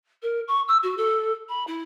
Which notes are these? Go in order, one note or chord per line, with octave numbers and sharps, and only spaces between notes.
A#4
C#6
E6
F#4
A4
B5
E4